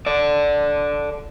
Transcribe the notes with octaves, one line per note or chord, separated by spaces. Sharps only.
A4 D5